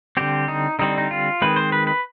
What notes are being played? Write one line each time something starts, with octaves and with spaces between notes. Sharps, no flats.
D3 G3 C4 G4
D#4
D3 G3 C4 D#4
D#4
F4
D#3 G#3 C4 B4
C5
B4
B4